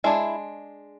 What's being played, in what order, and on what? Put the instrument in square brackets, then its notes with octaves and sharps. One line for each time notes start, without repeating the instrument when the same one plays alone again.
[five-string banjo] G#3 D4 E4